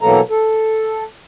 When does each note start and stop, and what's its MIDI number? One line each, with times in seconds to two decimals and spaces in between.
0.01 0.20 47
0.01 0.20 52
0.01 0.20 54
0.01 0.20 58
0.01 0.20 69
0.01 0.20 82
0.30 1.04 69